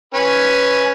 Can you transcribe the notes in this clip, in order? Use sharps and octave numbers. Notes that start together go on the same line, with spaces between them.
C#4 B4 G#5